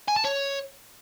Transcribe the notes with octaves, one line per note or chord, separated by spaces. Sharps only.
G#5
A5
C#5